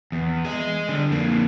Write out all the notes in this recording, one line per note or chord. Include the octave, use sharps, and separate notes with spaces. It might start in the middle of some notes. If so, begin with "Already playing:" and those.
E2
G#4 D#5
D3 G3
F2 A#3